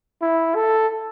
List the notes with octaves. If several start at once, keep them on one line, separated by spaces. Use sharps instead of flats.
E4
A4